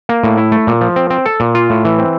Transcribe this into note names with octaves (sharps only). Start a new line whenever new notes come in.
A#3
A2
E4
A3
A#2
F3
C4
C4
A4
A#2
F4
A2
E3
C4